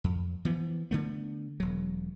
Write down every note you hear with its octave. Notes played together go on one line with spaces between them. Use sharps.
F2
E3 F3 B3
D3 A3 B3
E1 F#3